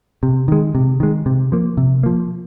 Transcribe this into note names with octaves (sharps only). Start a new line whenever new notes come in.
C3
D#3 G#3
C3
D#3 G#3
C3
F3 A#3
C3
F3 A#3